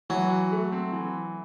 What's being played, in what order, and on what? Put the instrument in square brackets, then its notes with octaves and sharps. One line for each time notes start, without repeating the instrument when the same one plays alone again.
[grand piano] E3 [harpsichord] F#3
[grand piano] F#4
A3
C4
E3